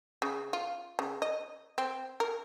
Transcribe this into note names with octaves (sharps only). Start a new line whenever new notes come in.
C#3
F4
C#3
D#5
C4
A#4